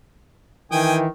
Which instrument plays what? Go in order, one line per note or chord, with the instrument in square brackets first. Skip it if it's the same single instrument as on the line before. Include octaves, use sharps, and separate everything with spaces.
[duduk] D#3 [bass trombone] E3 [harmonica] G5 G#5 D#6